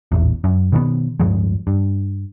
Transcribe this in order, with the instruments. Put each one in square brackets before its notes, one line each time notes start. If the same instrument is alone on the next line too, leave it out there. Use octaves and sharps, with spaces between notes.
[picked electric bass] D#1 A1 E2
F#2
B2 D#3 F#3 B3
D1 G2 F3 G#3
G2